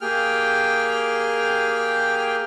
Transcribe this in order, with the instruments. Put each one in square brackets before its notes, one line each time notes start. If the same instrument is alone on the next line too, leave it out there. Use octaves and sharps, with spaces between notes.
[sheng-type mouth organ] A#3 G4 G#4 G5 F6